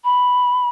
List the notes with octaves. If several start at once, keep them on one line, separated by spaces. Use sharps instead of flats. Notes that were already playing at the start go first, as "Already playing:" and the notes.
B5